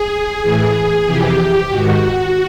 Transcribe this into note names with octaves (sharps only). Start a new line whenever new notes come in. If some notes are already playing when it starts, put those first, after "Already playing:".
Already playing: G#4
A2 E3
F2 C3 E3 G4
G#2 D#3 F#4